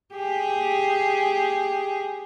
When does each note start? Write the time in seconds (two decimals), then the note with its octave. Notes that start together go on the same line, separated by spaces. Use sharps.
0.14 G4 G#4